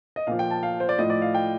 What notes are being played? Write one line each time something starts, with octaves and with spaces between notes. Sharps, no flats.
D#5
A#2 F3 F5
G5
A5
F5
C5
D5
A2 F3 D#5
D5
F5
G5